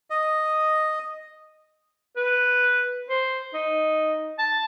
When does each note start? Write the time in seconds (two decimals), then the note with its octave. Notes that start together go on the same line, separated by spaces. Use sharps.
0.10 D#5
2.16 B4
3.09 C5
3.54 D#4
4.39 A5